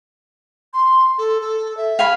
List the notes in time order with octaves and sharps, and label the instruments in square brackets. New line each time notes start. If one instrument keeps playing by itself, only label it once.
[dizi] C6
A4
A4
E5
[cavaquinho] F5 G#5 B5